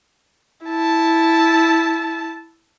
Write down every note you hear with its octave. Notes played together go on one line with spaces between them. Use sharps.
E4 A5